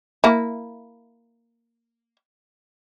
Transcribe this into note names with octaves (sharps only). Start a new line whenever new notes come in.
A#3 E4